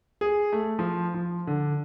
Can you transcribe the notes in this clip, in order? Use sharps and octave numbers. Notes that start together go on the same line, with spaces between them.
G#4
A3
F3
F3
D3